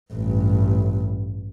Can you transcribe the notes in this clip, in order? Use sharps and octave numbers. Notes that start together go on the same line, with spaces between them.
A1 G2